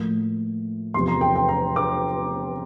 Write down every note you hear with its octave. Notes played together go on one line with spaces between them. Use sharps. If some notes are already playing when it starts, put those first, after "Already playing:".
Already playing: A2 F3 A#3
E2 C3 F3 C6
A#5
G5
G5
A#5
D6